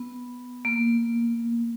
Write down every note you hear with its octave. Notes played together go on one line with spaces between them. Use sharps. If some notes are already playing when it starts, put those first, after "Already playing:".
Already playing: B3
A#3